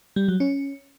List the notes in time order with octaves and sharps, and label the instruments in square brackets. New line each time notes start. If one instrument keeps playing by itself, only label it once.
[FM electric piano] G3
F#3
C#4